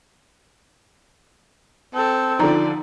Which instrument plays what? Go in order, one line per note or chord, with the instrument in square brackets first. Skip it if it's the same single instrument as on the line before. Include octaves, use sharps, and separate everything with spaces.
[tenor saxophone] C4 [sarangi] A4
[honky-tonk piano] D3 F3 [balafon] D#4 A#5 [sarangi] D5